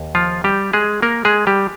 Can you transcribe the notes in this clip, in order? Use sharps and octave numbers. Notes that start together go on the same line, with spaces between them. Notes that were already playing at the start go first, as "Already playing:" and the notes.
Already playing: D#2
F3 F4
G3 G4
G#3 G#4
A#3 A#4
G#3 G#4
G3 G4